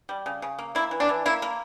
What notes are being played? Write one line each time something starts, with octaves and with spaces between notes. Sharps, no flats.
G3
C#3
C#3
A#3
A#3 E4
E3
D4
E3
A#3 E4
A#3